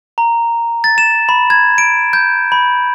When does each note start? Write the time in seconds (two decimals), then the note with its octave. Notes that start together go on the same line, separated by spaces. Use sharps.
0.18 A#5
0.84 A6
0.98 E7
1.29 B5
1.50 G#6
1.78 D7
2.13 G6
2.52 B5